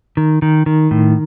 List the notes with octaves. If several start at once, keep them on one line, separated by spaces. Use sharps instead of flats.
D#3
D#3
D#3
A2